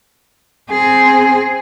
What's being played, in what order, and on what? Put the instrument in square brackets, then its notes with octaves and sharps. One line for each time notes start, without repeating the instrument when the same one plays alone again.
[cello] C4 G#4